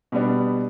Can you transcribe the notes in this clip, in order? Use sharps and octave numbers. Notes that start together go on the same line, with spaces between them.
B2 G3 B3 D4